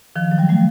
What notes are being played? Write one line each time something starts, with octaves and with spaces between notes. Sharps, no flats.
D#3 F3
F#3
F3 G3
G3 A3